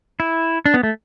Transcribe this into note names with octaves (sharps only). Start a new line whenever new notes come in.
E4
D4
B3
A3